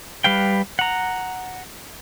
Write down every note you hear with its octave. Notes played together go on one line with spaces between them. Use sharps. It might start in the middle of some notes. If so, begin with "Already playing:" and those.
G3 B4 F5 G5
F#5 A#5